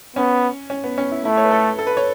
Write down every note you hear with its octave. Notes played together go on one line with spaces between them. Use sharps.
B3 C#4
C#4
B3
C#4
E4
A3 E4
C#5
B4
A4
A4
B4
C#5